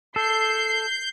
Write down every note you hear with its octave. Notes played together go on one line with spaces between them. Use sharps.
A4 G6 C7